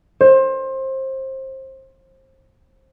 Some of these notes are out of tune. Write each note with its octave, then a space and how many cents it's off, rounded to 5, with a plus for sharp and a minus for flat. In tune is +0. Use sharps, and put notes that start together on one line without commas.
C5 +25